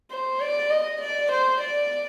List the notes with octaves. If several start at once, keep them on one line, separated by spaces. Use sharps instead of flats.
C5
D5
D#5
D5
C5
D5